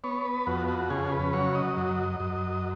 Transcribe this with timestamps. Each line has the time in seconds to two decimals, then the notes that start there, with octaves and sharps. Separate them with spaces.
0.04 B3 C#5
0.25 B4
0.47 F2 F#4
0.68 F#4
0.90 C#3 G#4
1.12 B4
1.33 F#3 C#5
1.55 D#5
1.77 F#2
2.20 F#2